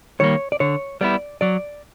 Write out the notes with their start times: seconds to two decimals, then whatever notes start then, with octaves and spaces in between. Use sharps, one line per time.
0.20 D#3 G3 A#3 C#5
0.52 D5
0.60 D3 C#5
1.01 G3 B3 E4 D5
1.41 F#3 D5